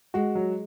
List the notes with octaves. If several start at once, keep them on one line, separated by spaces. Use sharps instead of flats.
G#3 F#4
F#3